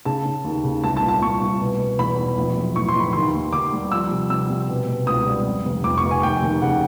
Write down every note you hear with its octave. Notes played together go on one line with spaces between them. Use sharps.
C#3 A5
C#3
D#2
C#3
C2 A5
A5
A#2
A5
C2 C#6
C2
B2
B2
E2 B5
B2
A#1
F#3
A2 C#6
C6
A#1 B5
D#2 C6
D#3
D#2 D6
G3
F3 E6
C3
C3 E6
C3
B2
B2
C#2 D#6
G3
F1
F1
F2 D6
C#6
F1
G#5
D#2 G5
D#2
C#3 F#5